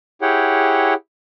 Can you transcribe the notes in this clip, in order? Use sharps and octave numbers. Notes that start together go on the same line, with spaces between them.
E4 G4 G#4 C#5 F#5 G5